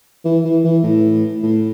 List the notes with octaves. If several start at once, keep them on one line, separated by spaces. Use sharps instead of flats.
E3
E3
E3
A2
A2